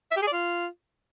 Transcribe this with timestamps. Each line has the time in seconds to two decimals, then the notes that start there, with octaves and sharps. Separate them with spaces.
0.11 E5
0.16 G4
0.22 G#4
0.27 D5
0.33 F4